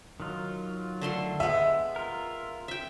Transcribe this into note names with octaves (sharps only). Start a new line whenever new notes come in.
D#3 F#3 F4
D3 A3 C6
G#3 B3 E5
F4 A#4
E5 G5